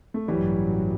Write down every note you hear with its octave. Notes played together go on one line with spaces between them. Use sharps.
A3
A1 G2 E3 F#3 G3